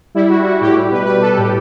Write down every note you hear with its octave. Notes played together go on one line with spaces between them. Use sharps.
G3 E4
G3 F#4
G3 F#4
A2 G4
G3 G4
B2 B4
G3 B4
G3 A4
A2 G4